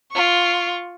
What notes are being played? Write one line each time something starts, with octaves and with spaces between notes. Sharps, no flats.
F4 C#6